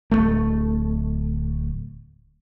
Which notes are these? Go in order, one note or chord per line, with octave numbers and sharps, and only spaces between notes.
D1 C#2 A3